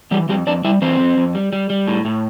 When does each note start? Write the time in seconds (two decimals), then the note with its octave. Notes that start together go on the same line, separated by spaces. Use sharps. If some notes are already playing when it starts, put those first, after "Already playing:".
0.11 E3 G3 G4
0.29 F2 G3 G4
0.47 F2 D4 D5
0.64 G3 E4 E5
0.82 E3 C4 C5
1.00 F2
1.17 F2
1.35 G3
1.53 G3
1.70 G3
1.87 A2
2.05 A2